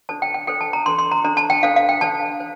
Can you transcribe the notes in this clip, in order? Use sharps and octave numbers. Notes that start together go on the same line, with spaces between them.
D4 A4 C5 A5
G5
G5
D4 A4 C5 G5
A5
A#5
D4 A4 C5 C6
C6
A#5
D4 A4 C5 A#5
A5
G5
D4 A4 C5 F5
F5
G5
D4 A4 C5 A5
C5